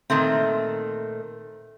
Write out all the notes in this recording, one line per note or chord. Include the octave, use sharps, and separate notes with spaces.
A#2 D#3 A3 C4